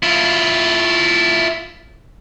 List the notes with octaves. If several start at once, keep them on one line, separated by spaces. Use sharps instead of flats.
E4 F4